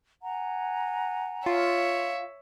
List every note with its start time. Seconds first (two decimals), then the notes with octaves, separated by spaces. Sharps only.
0.23 F#5 G#5 A#5
1.46 F4 C#5 E5